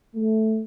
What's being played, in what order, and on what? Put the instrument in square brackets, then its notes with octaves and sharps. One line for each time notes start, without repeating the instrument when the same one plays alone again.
[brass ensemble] A3